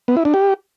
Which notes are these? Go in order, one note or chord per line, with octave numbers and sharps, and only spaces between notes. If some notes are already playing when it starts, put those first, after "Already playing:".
B3
E4
D4
G4